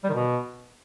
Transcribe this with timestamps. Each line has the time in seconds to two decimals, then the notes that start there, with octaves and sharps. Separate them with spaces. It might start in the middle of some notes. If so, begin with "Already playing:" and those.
0.04 G3
0.09 D#3
0.14 B2